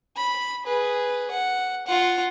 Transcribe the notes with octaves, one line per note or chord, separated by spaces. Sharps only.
B5
G#4 B4
F#5
F4 F#5